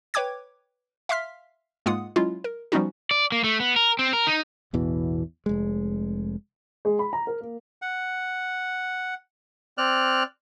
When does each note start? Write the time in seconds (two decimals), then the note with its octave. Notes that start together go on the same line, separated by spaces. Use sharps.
0.14 B4 C#5 G5 D6 G#6
1.09 E5 F5 C6 F6 B6
1.86 G#2 G#3 A#3 F4 F#5 D#6
2.16 F#3 G#3 C#4 E4 F4
2.44 A#4
2.72 F3 G3 B3 C#4 D#4 F#4
3.11 D5
3.32 A#3
3.44 A3
3.60 B3
3.76 A#4
3.99 C4
4.13 A#4
4.27 D#4
4.73 A1 E2 B2 E3
5.46 F1 G#3
6.85 G#3
6.99 B5
7.13 A#5
7.27 A#4
7.41 A#3
7.82 F#5
9.78 C4 D5 F6 F#6